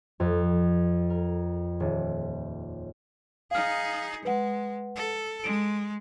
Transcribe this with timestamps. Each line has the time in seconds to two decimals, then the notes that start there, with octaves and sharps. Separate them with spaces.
0.20 F2
1.10 A#4
1.80 D#1
3.51 D#4 G#4 F5 F6
4.25 G#3 B4 F#5
4.96 A4
5.44 G#3 D7